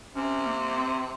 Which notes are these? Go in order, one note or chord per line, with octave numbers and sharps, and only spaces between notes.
C3 C#4
A#3
C4